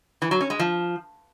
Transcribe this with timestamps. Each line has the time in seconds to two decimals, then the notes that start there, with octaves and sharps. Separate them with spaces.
0.22 E3
0.31 F#3
0.41 C#4
0.50 G#3
0.59 F3